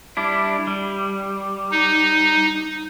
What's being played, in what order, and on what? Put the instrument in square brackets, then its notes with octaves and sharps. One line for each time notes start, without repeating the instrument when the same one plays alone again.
[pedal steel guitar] G3 D4 E4
G3
[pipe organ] D#4